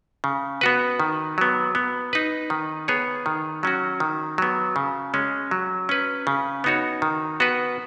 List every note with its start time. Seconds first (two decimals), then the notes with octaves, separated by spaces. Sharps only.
0.24 C#3
0.61 B3 F#4 B4
1.00 D#3
1.38 F#3 B3
1.75 B3
2.13 D#4 B4
2.50 D#3
2.88 B3 G#4 C#5
3.26 D#3
3.63 F#3 C#4 F#4
4.00 D#3
4.38 F#3 B3
4.76 C#3
5.14 G#3 C#4
5.51 F#3
5.89 C#4 B4
6.27 C#3
6.64 B3 D#4 F#4 C#5
7.02 D#3
7.40 B3 F#4 B4